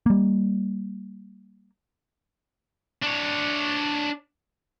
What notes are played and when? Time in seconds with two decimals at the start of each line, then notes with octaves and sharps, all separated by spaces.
0.06 G3 A#3
3.02 D4 C#5